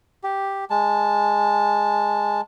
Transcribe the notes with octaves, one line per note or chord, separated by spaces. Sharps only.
G4
G#3 A5